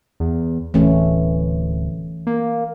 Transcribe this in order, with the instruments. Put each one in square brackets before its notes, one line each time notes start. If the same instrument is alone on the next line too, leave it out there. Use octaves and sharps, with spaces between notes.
[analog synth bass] E2
[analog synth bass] D1 [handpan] E3 A3 C#4
[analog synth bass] A#3